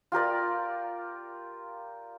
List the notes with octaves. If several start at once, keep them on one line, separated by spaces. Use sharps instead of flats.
F4 G4 A#4 D5